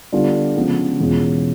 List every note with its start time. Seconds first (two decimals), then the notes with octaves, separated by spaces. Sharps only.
0.12 D3 G3 B3 D4 F4
0.56 C#3 F3 G#3 B3
1.00 E2 B2 G#3 C#4 F4